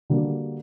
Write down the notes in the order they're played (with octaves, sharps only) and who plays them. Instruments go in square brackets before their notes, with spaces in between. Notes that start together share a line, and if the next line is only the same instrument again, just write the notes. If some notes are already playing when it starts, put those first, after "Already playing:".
[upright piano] D3 G3 A#3 F#4